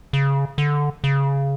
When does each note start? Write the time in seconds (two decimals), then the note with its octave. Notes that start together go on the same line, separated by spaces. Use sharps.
0.13 C#3
0.58 D3
1.04 C#3